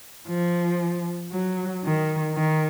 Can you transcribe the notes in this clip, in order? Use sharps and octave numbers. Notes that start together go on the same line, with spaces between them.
F3
F#3
D#3
D#3